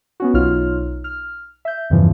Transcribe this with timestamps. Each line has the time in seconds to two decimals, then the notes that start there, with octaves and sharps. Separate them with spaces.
0.20 B3 C#4 F#4
0.34 B1 D#4 F4 C#5 F6
1.04 F6
1.65 E5 G6
1.90 E2 G2 C#3 E3 F3